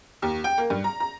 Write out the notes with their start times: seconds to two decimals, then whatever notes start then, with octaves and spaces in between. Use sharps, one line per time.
0.22 D#2
0.44 G5
0.58 A#3
0.70 G2
0.84 A#5
1.00 A#5